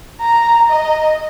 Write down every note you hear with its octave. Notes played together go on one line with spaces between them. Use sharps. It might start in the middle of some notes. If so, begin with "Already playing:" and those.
A#5
D#5